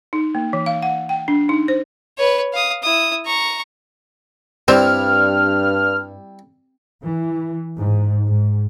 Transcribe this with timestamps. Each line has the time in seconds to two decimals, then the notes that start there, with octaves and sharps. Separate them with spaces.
0.13 D#4
0.35 A#3
0.53 E3
0.66 F5
0.83 F#5
1.09 G5
1.28 D4
1.49 D#4
1.68 C5
2.18 B4 C#5
2.53 F5 D#6
2.83 E4 D#6
3.26 A#5 C#6
4.68 G2 G3 C4 E4 F6
7.05 E3
7.77 G#2
8.25 G#2